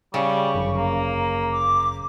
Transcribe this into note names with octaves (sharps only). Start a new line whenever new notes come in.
C#3 G3 C#6
G1 F#2
A#3 A#5
D6